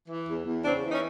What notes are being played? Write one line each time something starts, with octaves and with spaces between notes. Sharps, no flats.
E3
E2
E2
C#3 C4 D4
E3
C#4 D#4